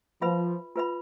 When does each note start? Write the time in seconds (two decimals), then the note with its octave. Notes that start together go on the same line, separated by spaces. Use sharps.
0.21 F3 F4 B4 E5 B5
0.76 F4 B4 E5 B5